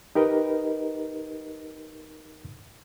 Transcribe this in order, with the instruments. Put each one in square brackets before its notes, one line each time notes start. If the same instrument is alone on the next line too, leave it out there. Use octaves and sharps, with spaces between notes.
[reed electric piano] D#4 G4 A#4 B4 D#5